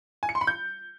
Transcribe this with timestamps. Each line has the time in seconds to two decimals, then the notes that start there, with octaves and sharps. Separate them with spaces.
0.23 G#5
0.29 C#7
0.35 C6
0.41 B5
0.47 G6